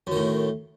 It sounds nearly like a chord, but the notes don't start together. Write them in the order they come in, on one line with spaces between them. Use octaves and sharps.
F#2 D#3 A2